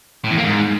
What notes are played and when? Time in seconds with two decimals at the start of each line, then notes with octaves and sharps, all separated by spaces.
0.24 A2
0.31 E2
0.38 A#3
0.44 G#2